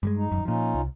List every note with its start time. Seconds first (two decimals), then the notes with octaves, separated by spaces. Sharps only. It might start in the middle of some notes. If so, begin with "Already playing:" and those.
0.03 G2 G3 G#3
0.16 D#4
0.32 D#1 G#1 F#2
0.45 A#2 F3 C#4 D#4 F4
0.74 C2